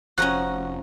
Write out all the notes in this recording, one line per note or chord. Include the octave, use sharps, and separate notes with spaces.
F1 F3 C#4 F#4 F#5 A#5 F#6